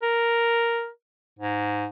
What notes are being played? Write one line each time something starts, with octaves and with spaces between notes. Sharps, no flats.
A#4
G#2